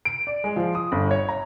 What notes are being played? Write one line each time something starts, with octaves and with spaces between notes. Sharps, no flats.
D7
D5
G#3
F3
D#6
G1
C#5
A#5